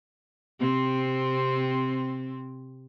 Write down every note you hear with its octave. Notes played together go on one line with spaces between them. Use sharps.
C3 C4